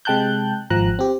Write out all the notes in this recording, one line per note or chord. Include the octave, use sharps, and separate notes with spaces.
C3 G#3 G5 A5 F#6 G6
G#1 F3 A#5 F#6
C4 G4